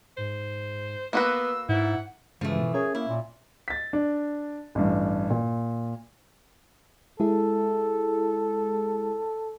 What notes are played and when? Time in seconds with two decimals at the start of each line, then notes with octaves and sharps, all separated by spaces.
0.17 G#2 C5
1.13 A#3 B3 F#4 B4 E6
1.69 G#2 E4 F#5
2.41 G2 C#3 E3 F3 G#3 A3
2.60 B2
2.74 C#4 G#4 A#4 C#5
2.95 A#3 E4
3.08 A#2
3.68 A6 B6
3.93 D4
4.75 A1 G2
5.30 A#2
7.20 G#3 E4 G#4 A4